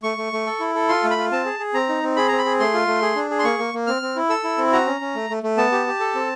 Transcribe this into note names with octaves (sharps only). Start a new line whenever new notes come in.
A3 C#6
A3
A3
A4
E4
A4
F4 C6
A3
B5
F4
C4 A5
G#4
G#4
C4 A#5
D#4
C4
G#4 B5
C4 A#5
B5
G#4
A3 C6
F4
A3
G#4
D4
G#4
C6
A#3 C#6
A#3
A#3
C4 F6
C4
E4
A4 E6
E4
C4
F#4 A#5
C#4
C#4
A3
A3
A3
B3 A5
G4
G4
A4
C4